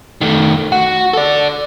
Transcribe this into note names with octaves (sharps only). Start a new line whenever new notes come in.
D#3 A3
F#4
A4 D5